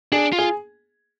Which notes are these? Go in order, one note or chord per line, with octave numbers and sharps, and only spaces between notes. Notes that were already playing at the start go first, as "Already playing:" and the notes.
D4 G#4
F4
G#4